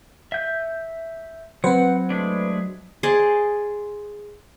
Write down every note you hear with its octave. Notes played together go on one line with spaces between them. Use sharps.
E5 G6
F#3 C4 B4 C5 F#5
G#3 A3 D4
G#4 C5 D5 D#5